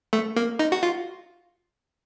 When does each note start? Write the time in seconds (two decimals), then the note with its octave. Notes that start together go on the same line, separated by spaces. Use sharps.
0.13 A3
0.36 A#3
0.59 D#4
0.72 F#4
0.83 F4